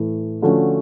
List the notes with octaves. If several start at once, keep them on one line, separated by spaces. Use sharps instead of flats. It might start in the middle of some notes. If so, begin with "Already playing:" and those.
Already playing: A2 E3 A3
D3 F3 A3 C#4 F#4